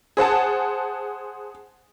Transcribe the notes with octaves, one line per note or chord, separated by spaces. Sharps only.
G#4 C5 F#5 A5